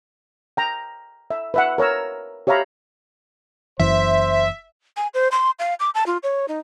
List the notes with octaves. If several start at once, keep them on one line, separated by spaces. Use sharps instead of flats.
G5 A#5
E5
B4 E5 F#5
A#4 C#5 A#5 E6
G4 C#5 E5 F5 A#5 B5
F#1 F#2 E3 C5 E5
G#5
C5
C6
F5
D6
A5
F4
C#5
D#4